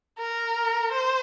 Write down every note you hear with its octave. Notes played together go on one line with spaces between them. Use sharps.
A#4
C5